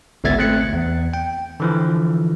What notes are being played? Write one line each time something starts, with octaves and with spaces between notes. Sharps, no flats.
G#1 C#2 B3 E5 G#6 A6
A3 C4 F#6 C#7
E2
G5
D3 E3 F3